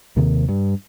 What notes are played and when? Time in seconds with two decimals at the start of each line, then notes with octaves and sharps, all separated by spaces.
0.16 D#2 C3 D#3
0.49 G2